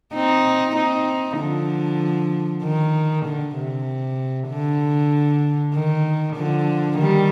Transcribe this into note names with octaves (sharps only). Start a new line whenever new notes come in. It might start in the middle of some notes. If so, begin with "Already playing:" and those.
C4 D#4
C4 D#4
D3 F3
D#3
D3
C3
D3
D#3
D3 F3
D#3 G3